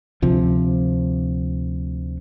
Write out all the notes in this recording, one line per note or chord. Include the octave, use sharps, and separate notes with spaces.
D2 C3 F3